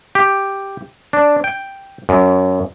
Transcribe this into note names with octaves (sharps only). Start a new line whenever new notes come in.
G4
D4
G5
F#2